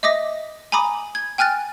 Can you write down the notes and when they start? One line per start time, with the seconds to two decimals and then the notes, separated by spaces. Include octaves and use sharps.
0.03 D#5 E5 D6 D#6 A#6
0.72 G#5 A#5 B5 D6 D#6
1.15 G#6
1.38 G5 G#5 F6 F#6 A6